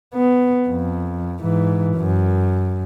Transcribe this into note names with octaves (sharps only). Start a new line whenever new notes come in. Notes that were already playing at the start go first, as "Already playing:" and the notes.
B3
F2
G#2 E3
F#2